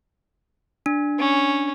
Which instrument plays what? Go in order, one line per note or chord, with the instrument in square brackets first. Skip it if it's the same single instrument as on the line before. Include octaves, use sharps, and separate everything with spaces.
[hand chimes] D4
[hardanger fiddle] C#4